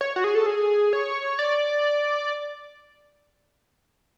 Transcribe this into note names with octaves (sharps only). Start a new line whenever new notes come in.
C#5
F#4
G#4
A4
G#4
C#5
D5